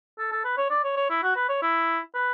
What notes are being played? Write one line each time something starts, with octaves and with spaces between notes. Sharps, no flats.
A4
A4
B4
C#5
D5
C#5
C#5
E4
F#4
B4
C#5
E4
B4